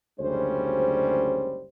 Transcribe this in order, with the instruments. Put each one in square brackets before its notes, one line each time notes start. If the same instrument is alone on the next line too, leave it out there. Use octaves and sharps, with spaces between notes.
[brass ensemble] F#1 D2 G3 G#3 C#4 C5